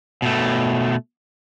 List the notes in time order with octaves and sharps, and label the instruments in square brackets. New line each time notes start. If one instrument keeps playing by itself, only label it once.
[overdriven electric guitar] B2 A3